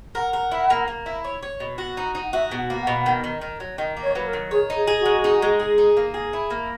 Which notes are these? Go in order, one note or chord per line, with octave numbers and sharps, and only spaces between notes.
A#4 F#5
A#4
E4
A#3
A#3
E4
C#5
C#5
B2
F#4
D#4
D#4
F#5
F#4 E5
B2
F#5
A#3
F#5
B2
D#3
D#3
D#3
F#3
D#3 D#5
A#3
C#5
F#3 B4
A#4
D#3
G#4 C#5
D#4
G#4
G#4
F#4
G#3
D#4
G#3
G#4
D#4
A#3
G#4
E4
A#3